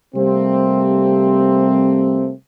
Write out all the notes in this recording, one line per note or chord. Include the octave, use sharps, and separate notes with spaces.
C3 G3 A3 A#3 C4